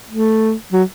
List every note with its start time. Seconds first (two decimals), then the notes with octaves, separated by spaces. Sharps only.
0.10 A3
0.72 F#3